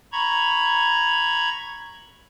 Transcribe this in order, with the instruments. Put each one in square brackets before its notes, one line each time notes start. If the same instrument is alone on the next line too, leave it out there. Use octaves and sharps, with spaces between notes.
[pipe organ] A#5 B5 C#6 G#6